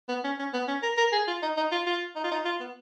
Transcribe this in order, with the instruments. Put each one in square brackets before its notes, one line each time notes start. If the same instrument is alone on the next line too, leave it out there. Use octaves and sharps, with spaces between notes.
[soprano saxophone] B3
C#4
C#4
B3
C#4
A#4
A#4
G#4
F4
D#4
D#4
F4
F4
D#4
F4
D#4
F4
B3